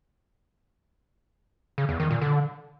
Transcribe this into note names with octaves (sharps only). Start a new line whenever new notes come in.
C#3
E2
D#3
A#2
D3